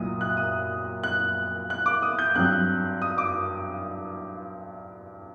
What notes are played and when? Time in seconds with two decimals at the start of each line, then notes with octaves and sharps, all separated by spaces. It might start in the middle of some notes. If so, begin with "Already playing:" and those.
Already playing: C2 A#2 F#3 A#3 D#6
0.21 F#6
0.37 D#6
1.03 F#6
1.70 F#6
1.86 D6
2.02 D#6
2.19 G6
2.35 G2 F#3 C4 F#6
3.02 D#6
3.18 D6